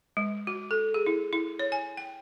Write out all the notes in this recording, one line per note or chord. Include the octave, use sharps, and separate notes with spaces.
G#3
F#4
A4
G#4
E4
E4
C#5
G#5
G5